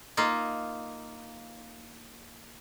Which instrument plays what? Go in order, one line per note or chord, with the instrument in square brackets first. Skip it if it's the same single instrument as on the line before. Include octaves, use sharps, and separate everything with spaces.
[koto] A#3 D#4 F4